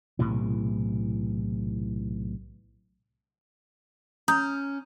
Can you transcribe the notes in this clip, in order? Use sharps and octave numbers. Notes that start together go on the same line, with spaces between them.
B1 A2 C3 E3
C#4 A#5 D#6 G6